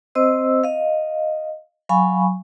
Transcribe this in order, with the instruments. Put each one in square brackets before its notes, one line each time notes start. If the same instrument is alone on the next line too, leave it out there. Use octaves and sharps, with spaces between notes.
[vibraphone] C4 C5 D#5 E6
D#5 F5
F#3 F5 G#5 B5 C#6